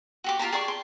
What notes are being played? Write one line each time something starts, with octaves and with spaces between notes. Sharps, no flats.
F#4 G4 D6
F4 G4 A5 A#5
G#4 D5 C#6
C6